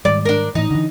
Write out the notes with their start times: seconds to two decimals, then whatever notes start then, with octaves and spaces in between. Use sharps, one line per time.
0.05 G#2 D#3 G3 D5
0.25 D4 A#4
0.55 A2 E3 D#4
0.71 D3 E3